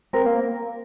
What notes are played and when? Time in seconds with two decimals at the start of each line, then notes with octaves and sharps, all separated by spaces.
0.13 C4 A#4
0.26 A#3